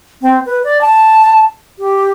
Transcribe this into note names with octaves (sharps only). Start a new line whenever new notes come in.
C4
B4
D5
A5
G4